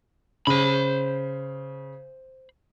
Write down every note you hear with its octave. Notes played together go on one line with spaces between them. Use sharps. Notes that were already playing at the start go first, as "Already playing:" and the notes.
C#3 C5 B5